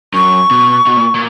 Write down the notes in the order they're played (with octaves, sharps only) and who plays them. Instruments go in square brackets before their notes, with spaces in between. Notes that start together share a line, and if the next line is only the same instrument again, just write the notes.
[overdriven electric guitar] F#2 [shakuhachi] C#6
[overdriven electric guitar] B2
B2
A#2
A#2